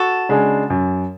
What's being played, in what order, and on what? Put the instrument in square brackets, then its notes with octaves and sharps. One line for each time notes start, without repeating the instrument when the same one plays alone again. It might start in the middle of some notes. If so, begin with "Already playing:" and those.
Already playing: [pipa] F#4 A4
[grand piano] C#3 G#3 D4 G#4
F#2